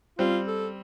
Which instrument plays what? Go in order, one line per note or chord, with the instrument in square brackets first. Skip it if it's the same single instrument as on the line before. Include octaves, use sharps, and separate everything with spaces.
[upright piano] G3 C4 [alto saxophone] F4
[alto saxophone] A4